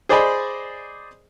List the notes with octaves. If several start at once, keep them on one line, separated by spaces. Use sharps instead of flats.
G#4 C5 D5 D#5 G#5 B5